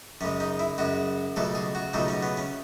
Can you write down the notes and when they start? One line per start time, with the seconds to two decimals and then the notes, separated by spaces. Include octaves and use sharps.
0.21 F#2 C#3 G#3 C#4
0.40 D#4
0.59 E4
0.78 F#2 C#3 G#3 F#4
1.36 C#2 B2 F#3 A3 A4
1.55 G#4
1.75 F#4
1.93 C#2 B2 F#3 A3 D#4
2.08 C#4
2.22 B3
2.37 C#4